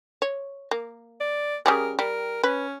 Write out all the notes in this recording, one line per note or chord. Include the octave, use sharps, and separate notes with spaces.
C#5
A#3
D5
C#3 G3 G#4 A#4
G3 A#4
C#4 B4